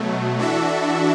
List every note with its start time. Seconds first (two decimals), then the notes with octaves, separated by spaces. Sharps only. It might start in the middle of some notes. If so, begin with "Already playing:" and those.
Already playing: B2 F#3 A3
0.38 E3 D4 F#4 A4 E5